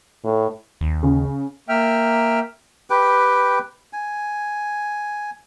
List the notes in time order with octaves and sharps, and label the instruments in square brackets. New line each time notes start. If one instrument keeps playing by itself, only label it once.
[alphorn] A2
[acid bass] D#2
[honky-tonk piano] C#3
[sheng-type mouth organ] A#3 E5 G5 F6
[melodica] G4 B4 G5
G#5